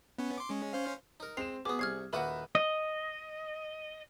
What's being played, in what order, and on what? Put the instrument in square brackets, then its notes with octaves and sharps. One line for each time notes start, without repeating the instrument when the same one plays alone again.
[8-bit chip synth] B3 C#4
C6 D6
G#3 C#4
C#4 C5 F5
[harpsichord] D#4 A#4
[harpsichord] G#3 [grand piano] C4 E7 [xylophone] C7 F7
[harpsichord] B2 B3 [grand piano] G#4 [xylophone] D6 D#6
[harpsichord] C2 C#6 [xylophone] F6 G#6 C7
[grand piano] D#1 B4 E5 [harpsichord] A#3 D#4 F#4 [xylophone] F#5 B5
[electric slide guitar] D#5